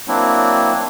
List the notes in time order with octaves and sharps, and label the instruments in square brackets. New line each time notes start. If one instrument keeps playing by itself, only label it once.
[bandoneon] F#3 A#3 C4 D4 E4